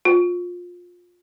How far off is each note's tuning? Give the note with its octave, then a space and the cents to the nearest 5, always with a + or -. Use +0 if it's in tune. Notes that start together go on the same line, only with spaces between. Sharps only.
F4 +20